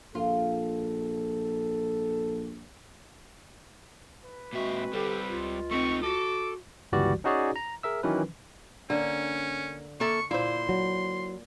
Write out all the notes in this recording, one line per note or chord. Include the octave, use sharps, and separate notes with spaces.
A#1 F4 A4
B4
A#2 G#3 C4 F#4 E5
D3 G3 C4 G4 A4
C#2 F4
A3 C4 D#4 C#6
F#4 A4 D6
G1 C#2 E3 G3 F#4 D5
C#4 D#4 F#4 G#4 C#5 D5
A#5
G#4 A#4 E5 E6
D#3 E3 F#3 C#4 B4
D3 A#3 C#4
A#3 A4 E5 C#6
A#2 E4 C5 C6
F#3